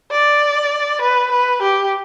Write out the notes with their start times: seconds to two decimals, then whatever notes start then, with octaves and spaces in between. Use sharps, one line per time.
0.11 D5
1.02 B4
1.32 B4
1.62 G4